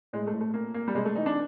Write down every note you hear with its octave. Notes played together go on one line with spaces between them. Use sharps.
A2 G#3
A3
A2
A3
A#2 A#3
A#2 A#3
G3
C3 G#3
A3
E3 D#4
D4